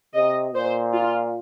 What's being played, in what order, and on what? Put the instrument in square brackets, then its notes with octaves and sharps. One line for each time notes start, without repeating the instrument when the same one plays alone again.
[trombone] C3 [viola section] D#5
[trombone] A#2 [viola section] C5
[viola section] F4